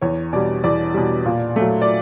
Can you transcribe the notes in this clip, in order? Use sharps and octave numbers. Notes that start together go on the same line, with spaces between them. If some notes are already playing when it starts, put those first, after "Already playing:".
E2 C#5
B2 G3 D5
E2 D5
B2 G3
A#2
F#3 A3
D5